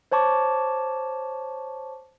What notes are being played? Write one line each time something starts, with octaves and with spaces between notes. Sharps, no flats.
C5 C#5 A5 C#6 D6